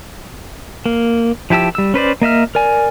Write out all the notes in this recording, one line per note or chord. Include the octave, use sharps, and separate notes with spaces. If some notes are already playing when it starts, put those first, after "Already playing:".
A#3
F3 E4 G4 A5 E6
G3 E6
C#4 B4 C5 D5
A#3 D#5 E5 F6
A#4 D5 G#5